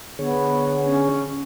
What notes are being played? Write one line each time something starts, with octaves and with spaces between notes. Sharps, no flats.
D3 B3 G#4 C#5
C#4